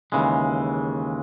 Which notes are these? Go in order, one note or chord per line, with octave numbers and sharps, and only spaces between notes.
D#2 C#3 E3 G#3